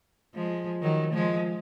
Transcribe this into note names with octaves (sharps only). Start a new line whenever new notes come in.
F3 G#3
D#3 F#3
F3 G#3